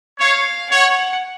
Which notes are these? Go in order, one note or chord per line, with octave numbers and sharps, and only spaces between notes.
C#5 F5
C#5 F#5